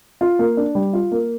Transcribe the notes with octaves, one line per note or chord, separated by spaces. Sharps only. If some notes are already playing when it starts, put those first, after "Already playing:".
F4
A#3
D4
G3
F4
A#3